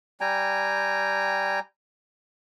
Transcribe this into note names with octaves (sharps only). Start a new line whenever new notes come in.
G3 G5 G#5 A#5